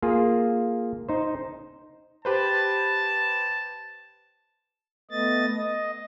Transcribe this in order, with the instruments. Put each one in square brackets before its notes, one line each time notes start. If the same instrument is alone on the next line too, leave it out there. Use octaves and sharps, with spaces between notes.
[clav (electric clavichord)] A#3 F4 G#4
D#4 C5
[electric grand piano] G4 B4 C5 [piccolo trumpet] A5
[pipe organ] A3 B3 D#5 A6
D#5